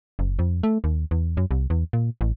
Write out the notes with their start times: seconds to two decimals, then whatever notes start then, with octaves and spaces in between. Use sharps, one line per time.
0.19 F#1
0.39 F2
0.63 A3
0.84 D#2
1.11 E2
1.37 F#2
1.51 C2
1.70 E2
1.93 A#2
2.21 A1